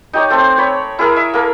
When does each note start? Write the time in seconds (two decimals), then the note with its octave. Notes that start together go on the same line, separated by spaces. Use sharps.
0.13 D#4 G4 C#5
0.30 A3 C4
0.58 C#5 B5
0.99 E4 G#4 A#4
1.16 E5
1.34 A#3 A4 A#4